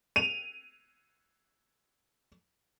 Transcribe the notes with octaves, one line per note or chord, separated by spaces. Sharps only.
D#7 F7